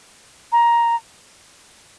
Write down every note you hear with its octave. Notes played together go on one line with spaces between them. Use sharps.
A#5